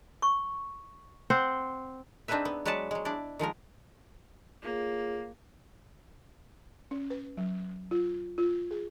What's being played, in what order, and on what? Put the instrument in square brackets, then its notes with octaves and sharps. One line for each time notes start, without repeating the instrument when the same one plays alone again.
[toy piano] C#6
[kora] C4 C5 F#5
[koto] C4 D4 D#4 G#4 B4 E5
B3
F#3 G#3 B4 D5 F#5 A5
F#3 G#3
D4 E4 D5
D#3 F3 G#3 A#4
[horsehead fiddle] A#3 [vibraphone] F4 G#4 C#5
[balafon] C#4
B4
F#3
F4
F4
G#4